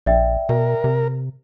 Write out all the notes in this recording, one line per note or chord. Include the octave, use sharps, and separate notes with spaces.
A#1 D5 E5 G5
B2 A#4
C3